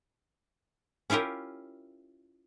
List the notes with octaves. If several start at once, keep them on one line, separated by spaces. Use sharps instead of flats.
C#4 E4 F4 G4 A#4